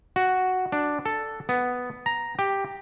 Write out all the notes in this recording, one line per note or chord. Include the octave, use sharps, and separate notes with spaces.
F#4
D4
A4
B3
A#5
G4